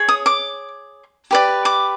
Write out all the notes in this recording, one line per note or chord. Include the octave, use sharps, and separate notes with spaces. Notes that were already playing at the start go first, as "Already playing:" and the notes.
Already playing: G#4 C#5
D#6
D6
G4 B4 D5
D6